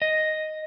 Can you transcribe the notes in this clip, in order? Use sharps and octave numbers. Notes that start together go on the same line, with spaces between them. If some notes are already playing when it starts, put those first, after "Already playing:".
D#5